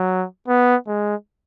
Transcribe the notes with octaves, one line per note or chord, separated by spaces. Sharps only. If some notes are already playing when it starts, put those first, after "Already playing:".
Already playing: F#3
B3
G#3